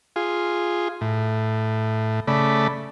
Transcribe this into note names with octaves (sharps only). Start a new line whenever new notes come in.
F4 G#4
A2
C#3 A3 D5 B5